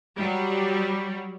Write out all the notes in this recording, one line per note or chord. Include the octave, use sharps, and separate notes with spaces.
F#3 G3